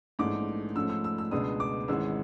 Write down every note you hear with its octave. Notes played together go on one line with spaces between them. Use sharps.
A#1 G#2 E3 A3 C#4 D6
G#2 F3 A3 C#4 E6
E6
E6
E6
C#2 B2 G#3 B3 D4 D#6
D6
G#1 G#2 E3 G#3 C#4 E6